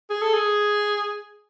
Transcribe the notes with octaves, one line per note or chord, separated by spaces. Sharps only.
G#4
A4
G#4